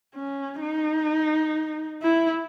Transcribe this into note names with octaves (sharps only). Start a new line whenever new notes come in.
C#4
D#4
E4